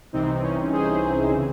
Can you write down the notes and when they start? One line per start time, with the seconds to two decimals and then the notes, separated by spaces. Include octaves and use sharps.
0.13 C2 C3 E3 C4 D#4
0.27 C4
0.43 C#4
0.72 G#4 C5
0.82 G#4 C5
0.91 C#4 E4
1.02 C#4
1.31 C#3 E3 C4